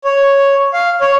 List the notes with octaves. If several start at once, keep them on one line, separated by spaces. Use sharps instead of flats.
C#5
F5
C#5